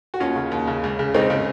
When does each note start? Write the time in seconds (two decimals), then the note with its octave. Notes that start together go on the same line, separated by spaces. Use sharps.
0.14 F#4
0.20 D#2 C#4 F4
0.36 C#3
0.52 D#2
0.67 C#3
0.83 C#2
0.99 C#3
1.14 C#2 C4 D#4
1.30 C#3